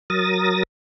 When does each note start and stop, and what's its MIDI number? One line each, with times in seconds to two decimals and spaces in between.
0.10 0.63 54
0.10 0.63 70
0.10 0.63 87
0.10 0.63 93
0.10 0.63 94